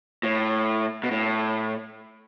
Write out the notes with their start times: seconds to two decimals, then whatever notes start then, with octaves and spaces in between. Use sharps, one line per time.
0.23 A2
1.03 B2
1.11 A2